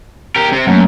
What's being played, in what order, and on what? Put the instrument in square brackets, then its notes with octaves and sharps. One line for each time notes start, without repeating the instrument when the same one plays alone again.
[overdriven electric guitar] G4 A#4
C3 C4
[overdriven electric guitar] F#2 [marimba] F#3 A3 A#3